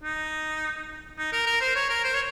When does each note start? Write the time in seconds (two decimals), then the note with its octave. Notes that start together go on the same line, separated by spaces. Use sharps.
0.04 D#4
1.18 D#4
1.33 A#4
1.47 A#4
1.61 C5
1.76 C#5
1.90 A#4
2.04 C5
2.14 C#5